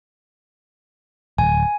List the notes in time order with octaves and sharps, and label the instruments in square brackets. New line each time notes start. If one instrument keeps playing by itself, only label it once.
[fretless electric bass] D1 [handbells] G#5